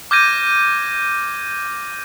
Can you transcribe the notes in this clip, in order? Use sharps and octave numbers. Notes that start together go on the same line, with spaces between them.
D6 F6 G6 G#6 A#6 D#7